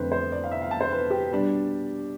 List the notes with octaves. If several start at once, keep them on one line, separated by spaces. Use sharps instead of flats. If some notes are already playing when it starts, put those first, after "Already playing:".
Already playing: F2 D3 A3 B4 C5
C5
D5
F5
E5
F5
A5
C5
B4
G4
B2 G3 D4